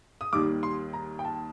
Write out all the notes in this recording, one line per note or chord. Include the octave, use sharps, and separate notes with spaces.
D#6
D#2 D#3 G3 D6
C6
A#5
G5
A5